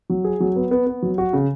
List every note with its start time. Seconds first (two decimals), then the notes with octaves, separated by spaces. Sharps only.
0.10 F#3
0.24 G#4
0.40 F#3
0.56 B3
0.71 B3
0.86 B3
1.02 F#3
1.18 F#4
1.33 C#3